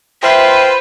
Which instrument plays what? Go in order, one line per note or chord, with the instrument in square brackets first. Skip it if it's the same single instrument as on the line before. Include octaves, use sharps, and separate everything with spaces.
[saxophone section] F4 C5 [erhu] B4 [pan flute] E5 [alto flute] G5